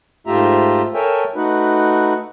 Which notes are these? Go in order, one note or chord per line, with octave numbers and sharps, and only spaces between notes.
G#2 A3 F4 G4 E5 A#5
A4 A#4 C#5 E5 G5 G#5
A3 D#4 F#4 B4